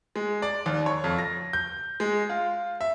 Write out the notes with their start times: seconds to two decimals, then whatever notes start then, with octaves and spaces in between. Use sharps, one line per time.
0.16 G#3
0.42 D5
0.66 D#2
0.86 C#5
1.04 F2
1.19 A#6
1.53 G6
2.00 G#3
2.30 F4
2.81 E5